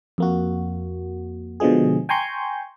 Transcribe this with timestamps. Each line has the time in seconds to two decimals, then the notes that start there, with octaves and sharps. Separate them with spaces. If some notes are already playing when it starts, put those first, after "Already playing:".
0.18 F2 A#3 F#4
1.60 B2 D3 F3 G#3 G#4
2.09 G5 G#5 A#5 C6 C#6 G6